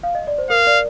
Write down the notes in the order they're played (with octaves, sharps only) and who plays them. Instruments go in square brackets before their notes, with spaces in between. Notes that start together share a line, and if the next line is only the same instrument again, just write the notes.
[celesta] F5
D#5
D5
C5
[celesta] A#4 [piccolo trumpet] F5
[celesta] D5